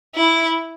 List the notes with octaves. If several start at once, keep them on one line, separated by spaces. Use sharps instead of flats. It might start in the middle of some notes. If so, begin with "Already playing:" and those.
E4